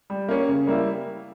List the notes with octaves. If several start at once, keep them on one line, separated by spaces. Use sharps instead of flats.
G3
A#3 C#4
C#3
G3 A#3 E4